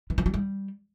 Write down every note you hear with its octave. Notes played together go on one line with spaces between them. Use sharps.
E3
F3
F#3
G3